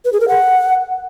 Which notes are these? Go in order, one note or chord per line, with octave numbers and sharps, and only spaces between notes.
B4
G#4
A#4
F#5